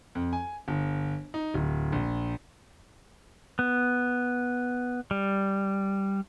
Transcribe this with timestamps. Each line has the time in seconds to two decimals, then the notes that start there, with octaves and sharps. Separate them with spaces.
0.15 F2
0.33 G#5
0.68 G1
1.34 D#4
1.54 D1
1.92 A#1
3.59 B3
5.11 G3